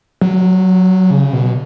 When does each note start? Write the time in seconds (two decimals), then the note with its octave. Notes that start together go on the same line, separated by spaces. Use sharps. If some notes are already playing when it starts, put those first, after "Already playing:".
0.21 F#3
1.11 C#3
1.33 B2